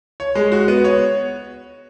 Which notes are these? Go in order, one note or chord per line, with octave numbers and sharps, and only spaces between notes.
C#5
G#3
F#4
B3
C#5